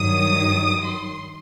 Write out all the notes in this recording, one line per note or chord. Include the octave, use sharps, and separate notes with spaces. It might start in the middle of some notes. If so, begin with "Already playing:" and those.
Already playing: G2 D#3 F#3 D#6
C6